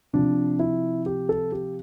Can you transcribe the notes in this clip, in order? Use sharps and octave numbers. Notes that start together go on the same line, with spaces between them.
C3 F3 D4
E4
G4
A4
G4